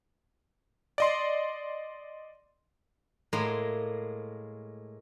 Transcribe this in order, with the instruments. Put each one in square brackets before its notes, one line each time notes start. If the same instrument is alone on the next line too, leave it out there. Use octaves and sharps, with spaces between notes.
[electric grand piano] D5 D#5 C6
[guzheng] A2 G#3 A#3 C6